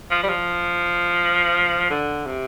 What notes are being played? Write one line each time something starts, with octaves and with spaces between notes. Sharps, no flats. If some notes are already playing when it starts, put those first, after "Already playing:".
F3
G3
F3
D3
C3